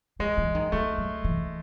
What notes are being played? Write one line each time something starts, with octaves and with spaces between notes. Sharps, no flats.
E3 G#3
E3
D#3
F#3 A3
F#3
E3